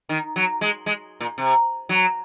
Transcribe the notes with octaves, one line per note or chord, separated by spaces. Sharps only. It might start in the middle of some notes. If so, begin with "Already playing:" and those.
D#3
F#3
G#3
G#3
A#2
C3
F#3